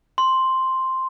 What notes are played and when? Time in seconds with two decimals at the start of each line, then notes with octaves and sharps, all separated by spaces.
0.18 C6